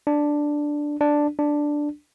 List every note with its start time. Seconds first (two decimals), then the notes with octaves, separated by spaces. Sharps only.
0.07 D4
1.01 D4
1.39 D4